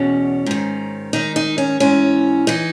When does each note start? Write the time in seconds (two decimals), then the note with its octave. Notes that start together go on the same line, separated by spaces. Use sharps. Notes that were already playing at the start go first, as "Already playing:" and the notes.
Already playing: E2 B2 C#4
0.46 G#2 D#3
1.13 G#2 D#3 D#4
1.36 D#4
1.58 C#4
1.80 G#2 E3 C#4
2.47 E3 D#4